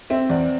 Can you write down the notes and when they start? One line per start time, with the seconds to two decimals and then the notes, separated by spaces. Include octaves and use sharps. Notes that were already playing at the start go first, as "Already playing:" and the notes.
0.10 C4 E5
0.30 E2 D5